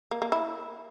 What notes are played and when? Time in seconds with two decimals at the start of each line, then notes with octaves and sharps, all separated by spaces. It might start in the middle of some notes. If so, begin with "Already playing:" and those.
0.11 A#3
0.22 A#3
0.32 E4